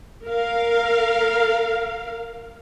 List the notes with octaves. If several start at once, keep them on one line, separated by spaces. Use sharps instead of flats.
A#4 F5